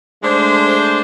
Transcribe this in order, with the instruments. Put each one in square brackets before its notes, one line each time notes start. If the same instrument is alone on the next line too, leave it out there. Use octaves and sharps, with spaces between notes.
[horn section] G#3 A3 D4 C5